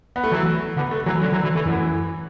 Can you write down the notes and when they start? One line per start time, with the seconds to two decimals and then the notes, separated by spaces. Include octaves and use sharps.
0.16 B3
0.24 A3
0.32 E3 F#3
0.76 D3 B3
0.91 A3
1.06 E3 F#3
1.22 D3 F#3
1.32 E3 F#3
1.43 E3
1.55 E3 A3
1.66 F#2 E3